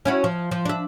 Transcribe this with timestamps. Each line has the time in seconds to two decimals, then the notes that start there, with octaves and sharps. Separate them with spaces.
0.05 C#4 E4 F#4
0.24 F3
0.51 F3
0.65 D4 E5